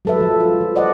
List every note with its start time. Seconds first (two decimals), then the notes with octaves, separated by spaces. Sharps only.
0.05 F#3 G#3 A4 B4 E5
0.20 F3
0.40 F4
0.61 F3
0.75 C5 D5 D#5 F#5